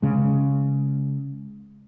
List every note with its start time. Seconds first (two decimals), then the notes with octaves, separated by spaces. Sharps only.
0.02 C#3 G#3